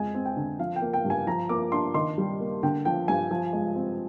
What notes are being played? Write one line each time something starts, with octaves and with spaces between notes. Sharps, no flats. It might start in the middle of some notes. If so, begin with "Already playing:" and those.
Already playing: F2 G#3 G#5
C4
G5
D3
F3 F5
G5
A#3
G5
G2
G#5
F3 A#5
A#3 D6
D4 C6
D#3 C6
G3
A#3
D3 G5
F3 G5
G2 G#5
F3
G#3
C4